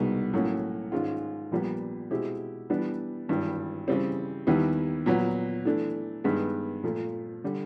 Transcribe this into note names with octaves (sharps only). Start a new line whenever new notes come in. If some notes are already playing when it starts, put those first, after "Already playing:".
Already playing: C2 B2 G#3 B3 D#4
A2 F#3 A#3 C#4
G#2 D#3 G#3 C#4 F4
A#1 A#2 G3 B3
B2 G#3 C4 E4 G4
E3 G3 B3 D4
G#1 G2 E3
C#3 E3 G3 C4
D#2 D#3 G3 B3 E4
A#2 F#3 B3
E3 A3 D4
G2 D#3 G#3 B3
A#2 F3 A3
D3 G3